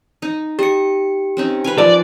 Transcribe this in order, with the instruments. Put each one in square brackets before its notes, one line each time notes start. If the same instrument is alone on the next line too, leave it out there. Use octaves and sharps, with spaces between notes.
[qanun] D#4
[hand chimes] G4 C#7 [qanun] D#5
[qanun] C4 C#4 D#4
B4 F5 G#5
[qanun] F3 [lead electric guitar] D5